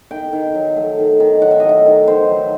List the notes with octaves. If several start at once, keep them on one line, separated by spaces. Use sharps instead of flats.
D#3 G5
D#3
F#3
A3
D#3
D#3
F#3 F#5
E5
A3 D#5
E5
D#3
D#3 C5
F#3